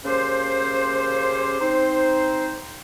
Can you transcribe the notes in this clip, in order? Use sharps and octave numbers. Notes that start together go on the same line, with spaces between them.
C#3 A#3 C#4 G4 C5
C4 D#4 C5